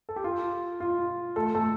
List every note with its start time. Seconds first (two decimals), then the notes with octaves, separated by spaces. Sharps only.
0.09 A4
0.16 G4
0.24 F4
0.80 F4
1.36 A3 A4
1.55 A3 A4